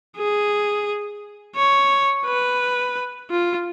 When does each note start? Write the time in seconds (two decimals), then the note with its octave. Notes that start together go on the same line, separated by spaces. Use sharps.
0.17 G#4
1.56 C#5
2.26 B4
3.30 F4